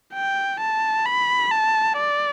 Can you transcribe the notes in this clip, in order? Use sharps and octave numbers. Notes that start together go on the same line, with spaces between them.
G5
A5
B5
A5
D5